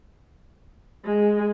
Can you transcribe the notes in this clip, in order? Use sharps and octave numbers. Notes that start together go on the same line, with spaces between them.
G#3